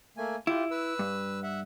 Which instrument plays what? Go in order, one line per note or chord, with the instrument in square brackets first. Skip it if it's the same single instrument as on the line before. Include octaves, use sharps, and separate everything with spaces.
[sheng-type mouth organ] A3 A#3 G#5
[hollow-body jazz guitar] E4 [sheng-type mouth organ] F4 G4
[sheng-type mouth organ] B4 E6
[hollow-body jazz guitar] G2
[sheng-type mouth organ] E5 F#5